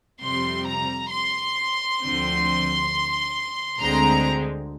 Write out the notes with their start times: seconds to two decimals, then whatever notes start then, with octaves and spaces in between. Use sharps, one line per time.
0.22 F2 C3 G3 C4 C6
0.66 A#5
1.11 C6
2.00 D2 D3 F3 C4
3.80 D2 D3 G#3 C4 A#5